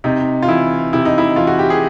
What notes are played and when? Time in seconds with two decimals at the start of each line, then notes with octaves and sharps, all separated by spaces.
0.04 C3 D#4
0.42 F4
0.48 E3 E4
0.93 C3 E4
1.05 D#4
1.18 E4
1.36 E3 F4
1.47 F#4
1.59 G4
1.70 G#4